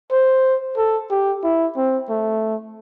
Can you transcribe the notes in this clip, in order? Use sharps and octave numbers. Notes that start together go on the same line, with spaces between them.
C5
A4
G4
E4
C4
A3